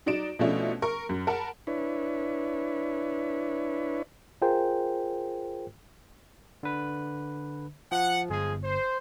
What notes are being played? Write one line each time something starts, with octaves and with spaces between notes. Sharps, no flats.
F#3 D#4 D5 D7 E7
B2 F3 A3 C#4 D4 E4
A#4 C#6
F#2
A#4 F#5 A5 B5
D4 E4 B4 C#5
F4 G#4 A#4 C5 G5
D3 B4
F3 F#5
G1 F3 G#3 G#4
C5